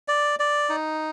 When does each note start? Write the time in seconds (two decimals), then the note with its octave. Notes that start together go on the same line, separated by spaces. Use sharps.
0.08 D5
0.40 D5
0.69 D#4